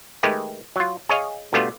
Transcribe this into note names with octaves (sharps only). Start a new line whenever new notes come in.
D#3 G#3 A3 G4 B4
F#3 F4
G#4 C#5 D#5 F5
B2 D3 G3 A3 B3 F4